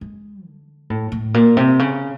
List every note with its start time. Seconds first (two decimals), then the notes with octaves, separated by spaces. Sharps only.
0.01 G#3
0.46 D3
0.90 A2
1.12 A2
1.34 A#2
1.57 C3
1.79 C#3